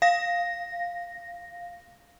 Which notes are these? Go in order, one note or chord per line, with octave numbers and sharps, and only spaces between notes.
F5 A#6